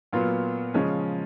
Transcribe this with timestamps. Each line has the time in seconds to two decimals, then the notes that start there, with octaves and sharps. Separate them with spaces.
0.13 A#2 F#3 B3 F4
0.74 C#3 F3 G#3 C#4